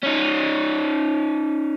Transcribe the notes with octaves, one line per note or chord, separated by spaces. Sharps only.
C#4 D#4